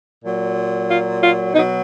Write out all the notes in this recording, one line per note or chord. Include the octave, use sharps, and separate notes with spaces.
A#2 F#3
F4
F4
B2 F#3 D#4